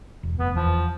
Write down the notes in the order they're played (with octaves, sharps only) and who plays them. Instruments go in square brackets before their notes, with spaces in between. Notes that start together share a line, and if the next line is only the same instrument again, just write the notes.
[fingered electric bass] E1
[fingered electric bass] F1 [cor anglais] B3
[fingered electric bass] E2 [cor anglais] F3